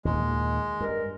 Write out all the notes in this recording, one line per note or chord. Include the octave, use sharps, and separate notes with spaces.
D#2 A#2 D#3 G#3
G2 A#4